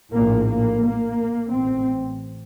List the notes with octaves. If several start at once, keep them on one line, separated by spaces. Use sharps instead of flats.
A#1 A2 A#3
A#3
A#3
A1 C4